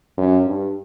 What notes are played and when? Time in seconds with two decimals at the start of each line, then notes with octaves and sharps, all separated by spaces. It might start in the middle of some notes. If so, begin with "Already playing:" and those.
0.18 F#2
0.46 G2